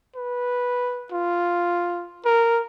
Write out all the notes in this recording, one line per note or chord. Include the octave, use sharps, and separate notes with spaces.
B4
F4
A#4